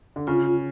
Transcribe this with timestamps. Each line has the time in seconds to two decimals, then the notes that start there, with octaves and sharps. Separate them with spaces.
0.16 D3
0.27 C#3 F4